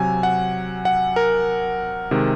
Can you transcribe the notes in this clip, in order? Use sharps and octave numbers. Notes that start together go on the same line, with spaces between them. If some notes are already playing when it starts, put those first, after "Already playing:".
Already playing: C3 F#3 G#5
F#5
F#5
A#4
C3 D#3 G#3